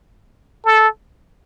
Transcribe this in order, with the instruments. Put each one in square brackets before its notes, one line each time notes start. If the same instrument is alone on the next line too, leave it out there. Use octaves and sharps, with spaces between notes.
[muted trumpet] A4